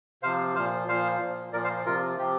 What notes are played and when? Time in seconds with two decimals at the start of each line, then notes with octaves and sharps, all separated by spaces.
0.23 C3 F3 C5 F5
0.55 A#2 F3 C5 F5
0.88 A#2 F3 C5 F5
1.21 A#2 F3
1.53 A#2 F3 A#4 D5
1.64 C5 F5
1.86 C3 F3 F4 A#4
2.19 C3 F3 G4